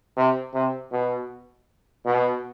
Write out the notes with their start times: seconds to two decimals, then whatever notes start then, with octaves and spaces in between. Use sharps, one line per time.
0.17 C3
0.54 C3
0.92 B2
2.05 B2